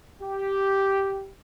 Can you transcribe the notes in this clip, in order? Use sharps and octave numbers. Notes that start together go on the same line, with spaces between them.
G4